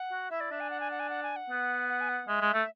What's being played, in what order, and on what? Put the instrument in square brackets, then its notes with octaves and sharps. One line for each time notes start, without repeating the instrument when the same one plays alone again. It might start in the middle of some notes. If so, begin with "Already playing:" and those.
Already playing: [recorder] F#5
[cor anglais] F#4
[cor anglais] E4 [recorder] E5
[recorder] D5
[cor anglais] D4 [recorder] E5
[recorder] G#5
F#5
G#5
F#5
G#5
F#5
G#5
F#5
[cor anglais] B3
[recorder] F#5
G#5
F#5
[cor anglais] G#3 [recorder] E5
[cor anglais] G#3
A3